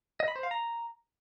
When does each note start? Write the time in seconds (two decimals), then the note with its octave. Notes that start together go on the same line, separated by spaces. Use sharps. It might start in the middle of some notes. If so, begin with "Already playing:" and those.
0.20 D#5
0.28 B5
0.36 C5
0.43 F5
0.51 A#5